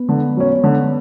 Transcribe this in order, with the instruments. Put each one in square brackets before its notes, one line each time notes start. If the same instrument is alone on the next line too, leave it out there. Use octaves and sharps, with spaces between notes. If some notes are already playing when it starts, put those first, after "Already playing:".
Already playing: [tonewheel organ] B3
[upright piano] D3
F#3 C#4
D3